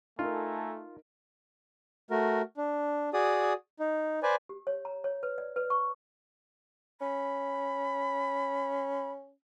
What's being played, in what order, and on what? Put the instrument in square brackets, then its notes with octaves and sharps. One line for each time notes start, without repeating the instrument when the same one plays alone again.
[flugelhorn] A3 [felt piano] D#4 A#4 [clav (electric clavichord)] F4 [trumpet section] A4 G#5 A#5
[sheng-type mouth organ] A3 F#4 A#4
D4
F#4 G#4 D5 D#6
D#4
B4 C5 D5 G#5
[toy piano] G4
C#5
A#5
C#5
B4
D5
B4
C#6
[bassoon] C#4 [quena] B5